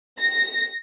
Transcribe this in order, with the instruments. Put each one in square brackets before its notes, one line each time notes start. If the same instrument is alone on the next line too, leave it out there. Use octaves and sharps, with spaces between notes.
[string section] A#6